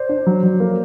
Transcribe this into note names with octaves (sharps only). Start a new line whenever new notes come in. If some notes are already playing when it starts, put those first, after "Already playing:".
Already playing: C5 D5
D4
F#3
F#3
A#3